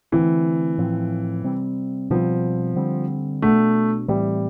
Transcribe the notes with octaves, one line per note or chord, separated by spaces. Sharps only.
D3 E3 A3 C4
A2 F3 C4
C3 G3 C4
B2 F3 G3 C4
D3 G3 C4
B2 A3 B3 D4
A2 E3 G3 A3 C4